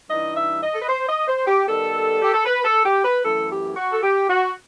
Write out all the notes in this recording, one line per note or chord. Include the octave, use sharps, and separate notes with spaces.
G2 E3 G3 D#4 D#5
E5
D#5
A4
B4
C5
D#5
C5
G4
D#3 G3 B3 A4
G4
A4
B4
A4
G4
B4
F#2 E3 A3 E4 A4
G4
F#4
A4
G4
F#4